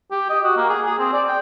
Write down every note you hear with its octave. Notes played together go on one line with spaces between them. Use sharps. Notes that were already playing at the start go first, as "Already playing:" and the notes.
G4
D#5
F#4
A#3
G#4
G#4
C4
D5
G5